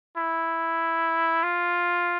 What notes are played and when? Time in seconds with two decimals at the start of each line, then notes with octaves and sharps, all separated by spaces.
0.17 E4
1.43 F4